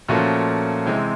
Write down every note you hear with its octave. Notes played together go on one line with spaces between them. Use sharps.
A#2 F3 A3 C#4 F#4
C3 E3 G#3 C4